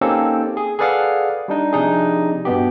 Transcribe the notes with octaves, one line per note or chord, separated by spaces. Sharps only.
A#3 C4 C#4 D#4 G4 A4
G#4
G#4 A4 B4 D5 F5 F#5
G3 D4 D#4
C3 F3 D4 D#4 G4 G#4
G2 B2 B3 G4